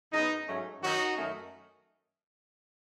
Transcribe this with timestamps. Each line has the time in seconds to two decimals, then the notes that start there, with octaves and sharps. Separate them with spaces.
0.12 F#2 C#3 G#3 B3 D#4
0.47 G#2 F#3 A3 C#4
0.81 F#2 D#3 F#3 C#4 D#4 F#4
1.16 F#2 D#3 A3 C#4